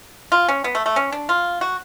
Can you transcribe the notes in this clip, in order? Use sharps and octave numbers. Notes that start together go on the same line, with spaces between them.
F4
C#4
B3
A3
A3
C#4
D4
F4
F#4